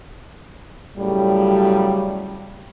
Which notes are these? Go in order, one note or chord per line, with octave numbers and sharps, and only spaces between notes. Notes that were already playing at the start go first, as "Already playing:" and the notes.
A2 C#3 F#3 G3